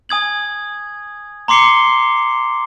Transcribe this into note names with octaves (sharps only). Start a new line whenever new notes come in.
G#5 D#6 G#6 F#7
A#5 C6 D6 C7 C#7 G7